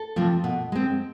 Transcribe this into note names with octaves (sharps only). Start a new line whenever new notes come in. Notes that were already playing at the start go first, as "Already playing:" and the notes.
Already playing: A4
C3 F3 A3 C4
B2
G#3 C4